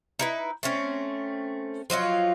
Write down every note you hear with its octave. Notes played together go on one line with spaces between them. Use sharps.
D#4 E4 B4
A3 C4 C#4
F3 F#3 D#4 F4